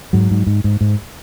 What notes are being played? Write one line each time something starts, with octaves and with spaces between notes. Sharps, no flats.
G#2 F#3
G#2
G#2
G#2
G#2